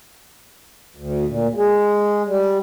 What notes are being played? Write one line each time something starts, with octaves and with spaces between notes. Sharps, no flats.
D2
A#2
G#3
G3